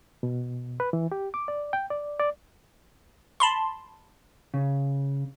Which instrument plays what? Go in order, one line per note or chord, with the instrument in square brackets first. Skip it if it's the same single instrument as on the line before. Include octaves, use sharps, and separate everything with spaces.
[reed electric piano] B2
B4
E3
G4
D6
D5
G5
D5
D5
[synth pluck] A5 B5 C6
[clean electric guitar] C#3